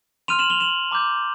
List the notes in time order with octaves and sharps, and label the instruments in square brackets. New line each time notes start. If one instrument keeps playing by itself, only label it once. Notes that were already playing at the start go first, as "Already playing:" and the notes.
[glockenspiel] C6 F6 D#7 F7
E7 F#7
F7 G7
E7 F#7
A#5 D6 G6